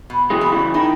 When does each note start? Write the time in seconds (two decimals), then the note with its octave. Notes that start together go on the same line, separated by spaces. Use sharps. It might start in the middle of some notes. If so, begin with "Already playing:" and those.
0.10 B2
0.30 E3 G#3
0.41 E4
0.52 C#3 E3
0.74 D#3 E4